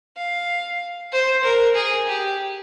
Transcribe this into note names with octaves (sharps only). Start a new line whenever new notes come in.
F5
C5
A#4
G#4
G4